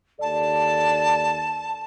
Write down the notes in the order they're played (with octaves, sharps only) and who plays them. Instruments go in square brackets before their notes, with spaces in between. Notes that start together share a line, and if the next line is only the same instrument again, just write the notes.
[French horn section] D#2 A4 D5 [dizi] A5